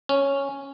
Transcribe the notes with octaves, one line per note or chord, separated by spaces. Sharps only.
C#4